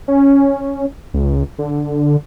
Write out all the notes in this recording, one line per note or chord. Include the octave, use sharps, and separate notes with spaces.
C#4
C#2
D3